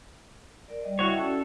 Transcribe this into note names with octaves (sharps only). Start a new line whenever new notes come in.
A#4 D5
G3 D5 D#5
E4 F#4 C#5 E5 G5
C#4 F#4 A4 D5